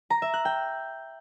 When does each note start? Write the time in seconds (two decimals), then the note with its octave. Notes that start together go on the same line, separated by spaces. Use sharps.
0.10 A#5
0.22 E5
0.34 F#6
0.45 G5